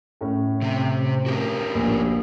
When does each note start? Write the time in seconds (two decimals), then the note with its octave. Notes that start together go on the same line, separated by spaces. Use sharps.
0.21 A2 C#4
0.62 C3 C4
1.26 F#4 G4 A#4
1.75 A#1